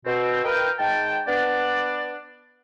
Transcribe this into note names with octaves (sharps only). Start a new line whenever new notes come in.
B2 C4
A#4 B4 D#5 F5 G5
G#2 G5 A5
B3 D4 D5